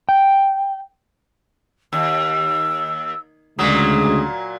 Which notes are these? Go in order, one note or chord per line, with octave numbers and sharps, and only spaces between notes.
G5
D#2 E6
D2 A#2 C#3 F#3 G#3 D#6